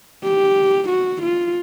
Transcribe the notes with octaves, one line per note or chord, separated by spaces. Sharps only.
G4
F#4
F4